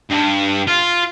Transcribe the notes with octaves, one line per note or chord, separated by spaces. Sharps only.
G2
F4